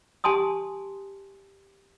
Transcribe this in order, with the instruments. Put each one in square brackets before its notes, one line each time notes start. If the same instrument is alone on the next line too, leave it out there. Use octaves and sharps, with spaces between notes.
[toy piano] G4 G#5 A5 C6 D#6